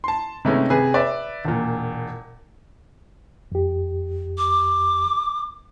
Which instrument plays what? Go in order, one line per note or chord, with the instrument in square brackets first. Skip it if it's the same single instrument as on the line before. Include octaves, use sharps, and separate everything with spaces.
[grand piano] A5 C6
C3 G#3 A3 B3 C#4 D#4
C3 G#4 B4
B4 D5 E5
E1 A#2
[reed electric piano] F2 G4
[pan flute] D6